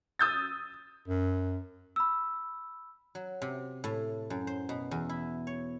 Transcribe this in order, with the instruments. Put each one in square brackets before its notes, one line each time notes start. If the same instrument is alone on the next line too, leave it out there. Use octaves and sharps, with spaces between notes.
[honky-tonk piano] D#6 E6 G6 A6
[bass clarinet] F#2
[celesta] B5 E6
[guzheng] F#3
C3
A2
F#2
C5
B2
E2
E4
C#5